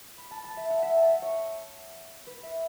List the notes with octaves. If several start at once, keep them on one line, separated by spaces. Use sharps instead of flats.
B5
A5
A5
E5
F#5
E5
A5
E5
C#5
B4
E5